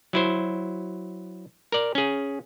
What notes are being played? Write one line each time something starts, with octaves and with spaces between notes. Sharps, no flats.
F#3 E4 C5
A#4 D5
C#4 G#4